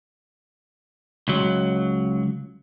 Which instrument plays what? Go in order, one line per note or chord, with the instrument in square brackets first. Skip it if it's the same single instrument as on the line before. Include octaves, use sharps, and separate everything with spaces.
[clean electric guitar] C#2 F#3